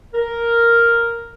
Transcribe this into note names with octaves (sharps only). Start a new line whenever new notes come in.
A#4